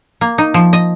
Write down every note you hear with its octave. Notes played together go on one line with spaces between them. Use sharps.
A#3
D#4
F3
D#5